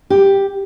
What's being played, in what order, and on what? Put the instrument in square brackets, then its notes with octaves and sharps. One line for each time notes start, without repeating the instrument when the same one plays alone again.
[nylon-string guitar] G4